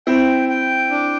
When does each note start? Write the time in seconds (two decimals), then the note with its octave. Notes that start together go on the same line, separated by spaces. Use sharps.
0.07 C4 E4 G5
0.49 G5
0.90 D4